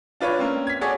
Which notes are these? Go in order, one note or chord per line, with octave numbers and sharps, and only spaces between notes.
D4 F4 B4 C#5
A#3 C4 C#4
G#6 B6
F#4 G#4 A4 C#5 D5